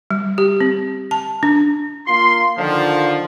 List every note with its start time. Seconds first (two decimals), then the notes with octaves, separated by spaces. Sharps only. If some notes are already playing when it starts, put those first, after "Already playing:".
0.11 G3
0.38 G4
0.61 C4
1.11 A5
1.43 D4
2.07 A#3 F4 C6
2.58 D3 D#3 F3